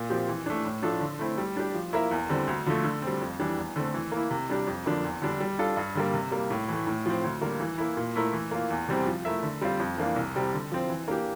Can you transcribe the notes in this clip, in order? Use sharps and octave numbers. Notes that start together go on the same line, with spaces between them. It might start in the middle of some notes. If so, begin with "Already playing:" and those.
Already playing: A#2
F3 C4 G4
E3
A3 D4
A2
F3 A3 D4 A4
D3
A3 C4 E4
G3
D4 G4
F3
A#3 E4 A#4 E5
E2
D3 G3 C4
D2
D3 F3 A3
D3
G3 C4
F2
E3 G3 D4
E2
D3 A3 C4
E3
A#3
E4
C3
G3 D4 G4
F2
D3 F3 A#3 D4
E2
D3 G3 D4
G3
D4 F4 A4
G2
D3 G3 A#3
C3
G3 A#3
A2
E3 A3
A2
F3 C4
D2
D3 G3 A#3 F4
E3
A#3 E4
A#2
A3 E4 A#4
E3
A#3 F4
E2
C3 E3 G3 C4
F3
A3 E4 A#4 E5
D3
G3 C4 F4 C5
F2
E3 A#3 D4 F4
C2
C3 G3 C4
D3
F3 C4
E3
A#3 D4 G4